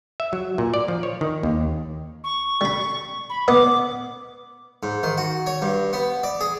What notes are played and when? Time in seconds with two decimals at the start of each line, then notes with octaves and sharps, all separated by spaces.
0.20 E5
0.33 F#3
0.58 A#2
0.74 D5
0.88 F3
1.03 C#5
1.21 D#3
1.43 D#2
2.24 C#6
2.61 G3 B5
3.30 B5
3.48 B3 B4 D#5 D6
4.83 G#2
5.03 D#3
5.17 F#4
5.46 C#5
5.62 G2
5.93 B3
6.23 D5
6.41 G#4